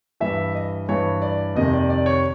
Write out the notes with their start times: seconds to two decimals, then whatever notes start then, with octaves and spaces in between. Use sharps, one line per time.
0.20 G2 E3 E5
0.55 D#5
0.89 G2 E3 C#5
1.22 D5
1.55 F2 C3 D#3 D#5
1.73 D5
1.90 D5
2.06 C#5